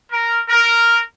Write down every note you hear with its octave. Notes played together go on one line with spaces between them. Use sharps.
A#4
A#4